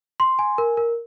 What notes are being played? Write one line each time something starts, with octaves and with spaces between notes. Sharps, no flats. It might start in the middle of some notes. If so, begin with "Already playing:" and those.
C6
G#5
A#4
A#4